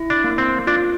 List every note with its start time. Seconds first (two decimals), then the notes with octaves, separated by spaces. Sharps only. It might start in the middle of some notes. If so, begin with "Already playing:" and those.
Already playing: E4
0.10 D4
0.24 A#3
0.38 C4
0.67 D4 F4